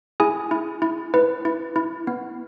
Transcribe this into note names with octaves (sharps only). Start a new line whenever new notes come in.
E4 G#4 G#5
E4
E4
E4 B4
E4
E4
B3